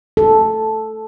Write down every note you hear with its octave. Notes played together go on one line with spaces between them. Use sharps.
A4